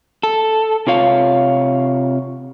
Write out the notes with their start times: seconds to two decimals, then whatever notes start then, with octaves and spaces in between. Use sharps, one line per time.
0.23 A4
0.87 C3 F4 C#5 F5